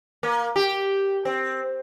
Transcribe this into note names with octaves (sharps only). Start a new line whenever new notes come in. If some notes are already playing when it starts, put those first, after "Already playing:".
A#3
G4
C4